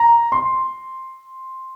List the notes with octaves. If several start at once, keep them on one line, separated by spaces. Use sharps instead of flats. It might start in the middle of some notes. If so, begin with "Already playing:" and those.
Already playing: A#5
C6